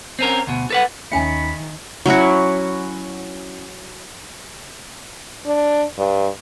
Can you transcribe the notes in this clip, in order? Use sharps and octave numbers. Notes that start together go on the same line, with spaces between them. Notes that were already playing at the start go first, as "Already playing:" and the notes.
C4 C#4 A#4
D2 B2
A4 B4 F#5
D#2 D#3 C#4 E5 G5 G#5 B5 C#7
F#3 C#4 E4 F#4
D4
G2